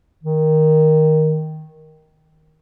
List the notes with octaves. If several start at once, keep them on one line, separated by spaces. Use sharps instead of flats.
D#3